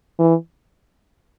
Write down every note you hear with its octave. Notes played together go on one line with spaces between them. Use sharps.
E3